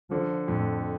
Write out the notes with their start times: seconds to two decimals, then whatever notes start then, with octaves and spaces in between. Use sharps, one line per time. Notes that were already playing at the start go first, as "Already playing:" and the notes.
0.11 D3 F3
0.48 F2 A2